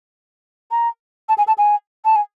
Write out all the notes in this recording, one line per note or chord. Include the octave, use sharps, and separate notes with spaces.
A#5
A5
G#5
A5
G#5
A5
G#5